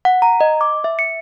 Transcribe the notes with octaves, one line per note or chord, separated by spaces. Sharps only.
F#5
A#5
D#5
D6
E5
C#7